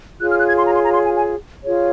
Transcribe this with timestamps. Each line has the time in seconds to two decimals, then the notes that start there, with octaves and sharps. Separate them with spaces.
0.20 F4 G#4 C#5 F#6
0.30 F6
0.38 F#6
0.47 G#6
0.57 C6
0.65 A#5
0.74 C6
0.84 A#5
0.92 C6
1.04 G#5
1.16 G#5
1.63 F4 G#4 C#5